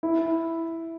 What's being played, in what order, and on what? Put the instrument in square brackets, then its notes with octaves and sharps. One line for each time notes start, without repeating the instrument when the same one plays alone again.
[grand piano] E4